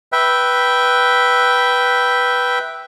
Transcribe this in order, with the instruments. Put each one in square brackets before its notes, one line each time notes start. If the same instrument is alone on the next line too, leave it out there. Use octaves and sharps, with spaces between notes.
[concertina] B4 E5 G5